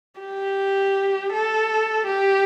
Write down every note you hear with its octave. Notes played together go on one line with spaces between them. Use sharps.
G4
A4
G4